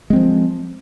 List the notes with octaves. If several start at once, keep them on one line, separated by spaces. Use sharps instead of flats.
F3 G#3 C4